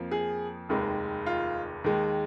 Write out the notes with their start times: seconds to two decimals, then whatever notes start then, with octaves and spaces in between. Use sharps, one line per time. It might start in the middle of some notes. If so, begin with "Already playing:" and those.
Already playing: F2 F3 A#3
0.11 G#4
0.69 F1 D#2 D#3 G#3
1.26 F4
1.84 D#2 D#3 G#3